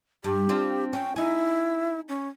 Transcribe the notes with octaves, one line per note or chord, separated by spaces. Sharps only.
G2 G4
C4 D4 F4
C#4 G5
D#4 E4 G#4
C#4